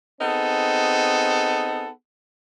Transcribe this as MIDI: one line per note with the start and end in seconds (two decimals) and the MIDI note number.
0.20 1.89 59
0.20 1.89 60
0.20 1.89 63
0.20 1.89 68
0.20 1.89 69